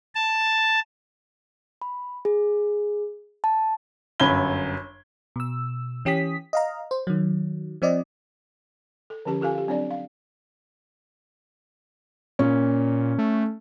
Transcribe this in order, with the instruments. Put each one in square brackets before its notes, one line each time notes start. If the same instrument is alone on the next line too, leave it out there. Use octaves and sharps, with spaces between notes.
[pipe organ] A5
[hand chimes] B5
G#4
A5
[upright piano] G1 F#2 B5 G#6 G7
[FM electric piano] B2 E6
E3 C#4 G4 D#6 B6
D#5 F5 A#5
C5
D#3 F#3
F3 C4 D5 D#5
[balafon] A4
D3 F3 C#4 G4 A5
F4 G4 A4 F5 G#5
G4 F5
F#3 C4 D4 C#5 D5
F5
[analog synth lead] A#2 [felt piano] C#4
[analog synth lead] A3